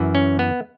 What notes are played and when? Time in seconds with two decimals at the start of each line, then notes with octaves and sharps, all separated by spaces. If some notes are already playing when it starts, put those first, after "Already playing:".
Already playing: F#2 E3
0.15 C#4
0.39 B3